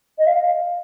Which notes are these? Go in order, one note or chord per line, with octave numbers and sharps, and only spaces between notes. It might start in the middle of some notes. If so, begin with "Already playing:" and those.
D#5
F5